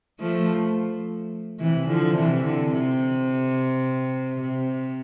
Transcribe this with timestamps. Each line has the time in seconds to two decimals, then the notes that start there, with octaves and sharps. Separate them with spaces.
0.20 F3 A3
1.60 C3 E3
1.88 D3 F3
2.16 C3 E3
2.44 D3
2.72 C3
4.40 C3